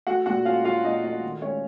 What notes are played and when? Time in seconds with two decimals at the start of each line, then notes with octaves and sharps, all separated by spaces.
0.07 A3 F#4 F#5
0.26 A#2 F#4 F#5
0.45 C#4 F4 F5
0.65 C#4 F4 F5
0.84 A#2 D#4 D#5
1.03 A3 D#4 D#5
1.24 D#3
1.42 A3 C#4 C#5